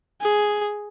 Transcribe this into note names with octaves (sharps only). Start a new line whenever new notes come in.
G#4